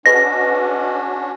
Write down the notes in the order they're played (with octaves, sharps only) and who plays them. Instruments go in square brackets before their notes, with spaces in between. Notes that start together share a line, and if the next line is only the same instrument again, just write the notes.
[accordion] C#4 D4 F#4 [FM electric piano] G#4 B4 D#5 [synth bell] A#6